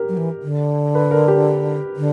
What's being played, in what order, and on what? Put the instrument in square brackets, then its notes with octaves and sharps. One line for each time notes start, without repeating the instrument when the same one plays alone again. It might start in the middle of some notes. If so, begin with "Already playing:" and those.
Already playing: [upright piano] G4 A#4
[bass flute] F#3
E3
D3
[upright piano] B4
A#4
G4
[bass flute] D3